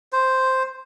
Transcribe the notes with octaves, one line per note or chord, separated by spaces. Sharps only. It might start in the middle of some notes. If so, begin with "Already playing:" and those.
C5